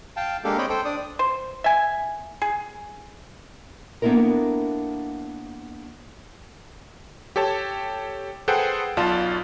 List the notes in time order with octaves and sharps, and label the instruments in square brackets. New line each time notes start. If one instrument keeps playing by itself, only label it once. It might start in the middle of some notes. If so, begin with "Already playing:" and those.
[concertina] F5 G5 A5
G#3 A#3 D4 G4 A4 F5
C4 C#5 D#5 G5 B5
A4 C5 G5
D4 D5 D#6
[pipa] C5
E5 G#5
G#4
[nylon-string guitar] A#3 B3 D4 E4 A4 A#4
[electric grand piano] G4 A4 C#5 A5
G#4 A4 B4 C5 F#5 G5
B1 B2 F4 D5 A5